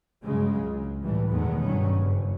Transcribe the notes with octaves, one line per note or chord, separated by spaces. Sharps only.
G2 C#3 F#3 G#3
C#2
A2 E3 G3
B1 E2 D#3 G#3 A3 B3
G2 D#3 F#3 G3 C#4
F#1